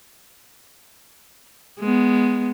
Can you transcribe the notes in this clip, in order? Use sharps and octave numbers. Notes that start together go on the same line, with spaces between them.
G#3 B3